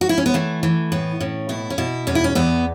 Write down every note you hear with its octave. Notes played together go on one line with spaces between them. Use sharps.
F#4
E4
C#4
B3
E3 A3
E3
A2 B3
A2 C#4
B2 E4
C#4
B2 E4
E2 C#4
E4
C#4
E2 B3